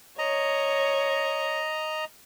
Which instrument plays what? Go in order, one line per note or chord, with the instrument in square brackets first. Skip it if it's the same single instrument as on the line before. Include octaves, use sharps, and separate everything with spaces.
[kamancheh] C#5 [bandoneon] D#5 A#5